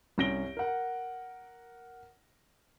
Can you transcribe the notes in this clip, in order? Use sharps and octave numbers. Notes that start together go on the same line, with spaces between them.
C2 C#4 A#6 D7 G7
A#4 F#5